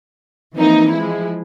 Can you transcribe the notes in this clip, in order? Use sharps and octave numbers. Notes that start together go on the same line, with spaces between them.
E3 F3 A#3 C4 D#4
F3 G#3 E4